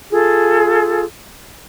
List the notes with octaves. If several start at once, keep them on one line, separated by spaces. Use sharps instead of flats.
F4 G#4 A4